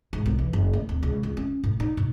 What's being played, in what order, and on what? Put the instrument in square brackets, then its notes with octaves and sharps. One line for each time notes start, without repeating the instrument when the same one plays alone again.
[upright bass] G#2
B1
E3
F#1
D2
D1
C#2
C#2
C#4
A2
D#4
A#2